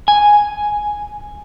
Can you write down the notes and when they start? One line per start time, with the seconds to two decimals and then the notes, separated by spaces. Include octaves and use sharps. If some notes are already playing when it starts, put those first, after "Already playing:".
0.08 G#5